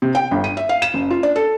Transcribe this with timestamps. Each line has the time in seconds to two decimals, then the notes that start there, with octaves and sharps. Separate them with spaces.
0.02 C3
0.15 G5
0.31 G1
0.44 D#7
0.57 E5
0.69 F5
0.82 E7
0.94 F#1
1.10 F4
1.23 D4
1.36 A4